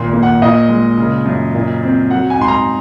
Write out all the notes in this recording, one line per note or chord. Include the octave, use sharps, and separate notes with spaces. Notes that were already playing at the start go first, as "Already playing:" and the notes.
Already playing: G#1 A#2 C6
A#3
F#5
A#2 D#5
G#3
C#3
F#2
A#2
C4
F#3 F#5
G#5
G#2 C6
A#5